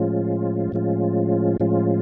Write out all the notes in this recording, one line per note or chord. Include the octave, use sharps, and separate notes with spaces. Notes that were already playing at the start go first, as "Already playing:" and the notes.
Already playing: A2 F3 G#3 C#4 F4
A2 F3 G#3 C#4 F4
A2 F3 G#3 C#4 F4